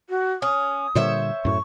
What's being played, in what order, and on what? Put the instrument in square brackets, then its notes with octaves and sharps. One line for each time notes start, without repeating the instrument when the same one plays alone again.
[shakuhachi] F#4
[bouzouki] C#4 [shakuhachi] D#6
[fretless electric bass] A#2 D3 G3 [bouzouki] C5 C#5 E5
[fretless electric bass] F#2 A2 [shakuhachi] C#6